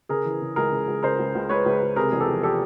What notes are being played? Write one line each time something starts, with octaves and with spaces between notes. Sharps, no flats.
C#3 G#4 A#4
E3
C#3
C#2 G#4 A#4
C#3
C#2
C#3 A#4 C5
C#2
C#2
C#2 B4 C#5
C#2
C#2
C3 G#4 A#4
E2 G#4
G4 A4
F3
G4 A4